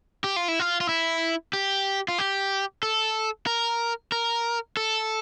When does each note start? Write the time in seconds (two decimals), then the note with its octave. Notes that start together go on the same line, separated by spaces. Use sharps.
0.24 G4
0.36 F4
0.48 E4
0.59 F4
0.81 F4
0.89 E4
1.53 G4
2.08 F4
2.18 G4
2.83 A4
3.47 A#4
4.12 A#4
4.77 A4